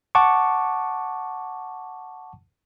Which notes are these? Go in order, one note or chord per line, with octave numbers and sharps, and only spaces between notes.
F#5 A5 C#6 D6